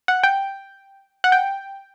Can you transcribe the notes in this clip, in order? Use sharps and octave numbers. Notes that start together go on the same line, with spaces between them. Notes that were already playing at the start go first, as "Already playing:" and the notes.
F#5
G5
F#5
G5